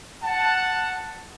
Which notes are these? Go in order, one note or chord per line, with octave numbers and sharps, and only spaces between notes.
F#5 A5